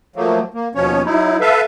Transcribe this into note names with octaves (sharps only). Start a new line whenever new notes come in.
F3 F#3 A3 A#3
A#3
D#2 B2 F3 C#4 C#5
F#3 D#4 E4
A4 B4 E5 F5